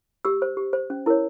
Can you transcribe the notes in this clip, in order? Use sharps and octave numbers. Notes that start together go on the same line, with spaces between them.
G4 E6
C5
G4
C5
C#4
E4 A#4 C#5